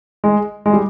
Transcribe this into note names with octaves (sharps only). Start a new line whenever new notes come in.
G#3
G#3
G3